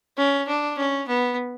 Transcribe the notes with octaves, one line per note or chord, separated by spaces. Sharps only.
C#4
D4
C#4
B3